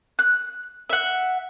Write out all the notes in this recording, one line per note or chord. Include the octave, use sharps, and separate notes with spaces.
F#6
E5 F#5